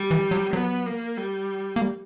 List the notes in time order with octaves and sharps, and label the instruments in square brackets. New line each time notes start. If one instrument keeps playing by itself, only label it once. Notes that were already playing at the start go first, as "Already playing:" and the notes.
Already playing: [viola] G3
[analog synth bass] E3
F#3
[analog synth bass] F#3 [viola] B3
[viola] A#3
G3
[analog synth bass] A#3
G3